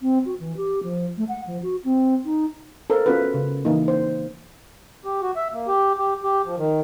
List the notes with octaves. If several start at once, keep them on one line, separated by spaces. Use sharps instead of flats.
C4
F#4
E3
G4
F3
A3
F#5
F3
F#4
C4
D#4
A4 A#4 C5
B3 C#4 F4 F#4 A4 B4
C#3
E3 A#3 D#4
C5
G4
F#4
E5
A#3
G4
G4
G4
F3
D#3